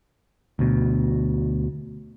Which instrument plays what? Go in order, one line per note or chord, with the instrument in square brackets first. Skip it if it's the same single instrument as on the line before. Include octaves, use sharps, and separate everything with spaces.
[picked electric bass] D2 B2